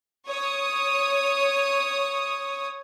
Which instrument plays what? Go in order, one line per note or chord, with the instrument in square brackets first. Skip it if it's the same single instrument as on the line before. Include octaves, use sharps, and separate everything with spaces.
[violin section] C#5 D#6